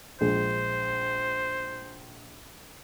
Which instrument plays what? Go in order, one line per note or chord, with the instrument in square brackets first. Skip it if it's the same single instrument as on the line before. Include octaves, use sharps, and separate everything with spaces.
[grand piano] A#1 G#3 [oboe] C5